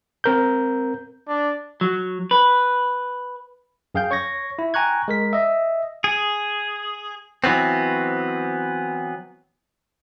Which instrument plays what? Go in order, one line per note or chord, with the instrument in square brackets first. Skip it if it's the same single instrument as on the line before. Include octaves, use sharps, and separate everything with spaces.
[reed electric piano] C4 A#4 G6
[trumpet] D4
[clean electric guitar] F#3
B4
[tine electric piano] F#2 G#4 F5 G5 G6
C#5 C#6 G#6 A#6
E4
G5 G#5 A#5 C#6 F#6 G#6
G#3 A#4 B6
D#5 E5
[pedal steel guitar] G#4
[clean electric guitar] E3 F#3 B3 C4